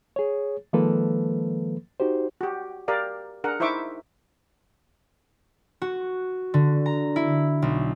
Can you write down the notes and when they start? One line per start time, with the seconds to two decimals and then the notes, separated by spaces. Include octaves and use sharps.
0.16 G#4 C#5
0.73 D#3 F3 G#3 A#3 A4 B4
2.00 D#4 F#4 G4 C5
2.41 F#4 G4
2.88 G4 A#4 D5 F5
3.44 D4 G#4 A#4 F#5
3.60 D#4 E4 C5 E5 C#6 D6
5.82 F#4
6.54 D3
6.86 A#5
7.16 E4
7.62 B1